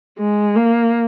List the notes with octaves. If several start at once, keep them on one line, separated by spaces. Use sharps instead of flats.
G#3
A#3